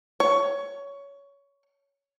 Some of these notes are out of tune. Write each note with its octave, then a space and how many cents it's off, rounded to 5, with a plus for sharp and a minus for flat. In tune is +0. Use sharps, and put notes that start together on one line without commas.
C#5 +15